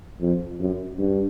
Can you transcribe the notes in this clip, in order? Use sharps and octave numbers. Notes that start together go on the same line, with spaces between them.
F2
F#2
G2